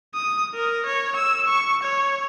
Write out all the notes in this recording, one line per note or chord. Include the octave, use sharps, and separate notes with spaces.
D#6
A#4
C#5
E6
C#6
C#5